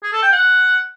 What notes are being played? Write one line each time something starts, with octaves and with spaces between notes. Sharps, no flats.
G#4
A4
G5
F#5